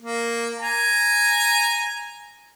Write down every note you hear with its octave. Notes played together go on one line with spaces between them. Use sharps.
A#3
G#5 A#5